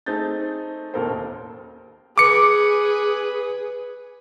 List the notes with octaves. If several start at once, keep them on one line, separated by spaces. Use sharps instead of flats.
A3 C4 D#4 G#4 G6 A6
E1 A1 D#2 A4 A#4 C5
G#4 B4 D6 C#7